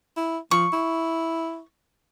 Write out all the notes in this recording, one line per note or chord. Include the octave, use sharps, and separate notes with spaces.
E4
F3 C#6
E4